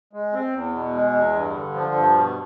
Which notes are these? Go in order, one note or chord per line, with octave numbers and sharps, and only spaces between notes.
G#3
C4
E2
B2
G#3
E2
G2
D3
F3
G2
B2